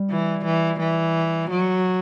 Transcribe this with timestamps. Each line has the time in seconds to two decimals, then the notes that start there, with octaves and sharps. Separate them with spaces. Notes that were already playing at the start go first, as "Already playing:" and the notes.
Already playing: G3
0.10 E3
0.45 E3
0.79 E3
1.50 F#3